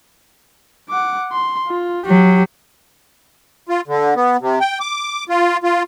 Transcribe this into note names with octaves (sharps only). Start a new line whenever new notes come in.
F#5 D6
C6
F4
F#3 G4
F4
D3
B3
C3
G5
D6
F4
F4